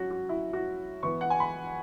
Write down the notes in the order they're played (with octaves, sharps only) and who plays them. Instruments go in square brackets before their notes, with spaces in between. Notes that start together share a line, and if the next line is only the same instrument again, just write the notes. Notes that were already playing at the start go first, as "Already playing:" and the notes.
Already playing: [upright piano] F#3 C#4 F#4
F#4
E4
F#4
E3 B3 E4 C#6
F#5
G#5
B5